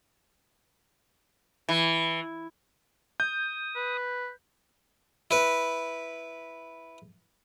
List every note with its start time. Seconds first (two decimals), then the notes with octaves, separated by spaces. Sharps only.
1.69 E3
3.20 D#6 G6
3.76 B4
5.31 E4 B4